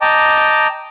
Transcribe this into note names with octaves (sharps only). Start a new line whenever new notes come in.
D#5 G5 A5 A#5 D6